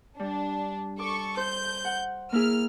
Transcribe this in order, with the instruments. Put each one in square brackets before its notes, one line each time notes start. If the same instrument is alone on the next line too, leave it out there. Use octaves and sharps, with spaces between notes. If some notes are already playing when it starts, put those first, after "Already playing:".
[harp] G3 [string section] D4
[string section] A4 C#6 [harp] D6
[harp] C5 [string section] G6
[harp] F#5
[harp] A#3 E4 G#4 [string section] F6